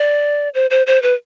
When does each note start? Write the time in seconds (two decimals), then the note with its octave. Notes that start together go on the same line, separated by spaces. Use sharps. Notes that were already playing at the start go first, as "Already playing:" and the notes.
Already playing: D5
0.54 C5
0.70 C5
0.87 C5
1.02 B4